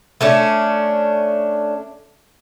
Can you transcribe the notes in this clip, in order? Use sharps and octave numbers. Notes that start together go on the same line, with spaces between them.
A3 C#4 D4